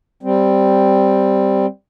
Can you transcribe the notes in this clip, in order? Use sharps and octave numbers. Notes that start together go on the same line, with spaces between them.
G3 C4